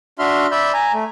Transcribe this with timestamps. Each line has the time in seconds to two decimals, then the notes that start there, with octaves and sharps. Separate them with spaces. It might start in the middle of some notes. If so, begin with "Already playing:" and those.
0.19 D4 F#4 E5 C6 F6
0.51 D5 E5 B5 E6 G6
0.74 G#5 A#5
0.93 A3